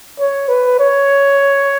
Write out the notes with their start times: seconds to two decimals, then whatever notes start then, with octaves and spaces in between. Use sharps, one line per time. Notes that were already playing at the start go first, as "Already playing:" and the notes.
0.19 C#5
0.49 B4
0.79 C#5